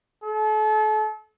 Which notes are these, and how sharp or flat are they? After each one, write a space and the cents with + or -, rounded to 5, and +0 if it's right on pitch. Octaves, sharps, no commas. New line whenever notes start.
A4 -40